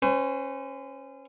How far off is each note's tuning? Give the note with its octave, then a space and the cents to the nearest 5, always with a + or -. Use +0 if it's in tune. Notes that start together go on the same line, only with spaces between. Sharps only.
C#4 -15 C5 -45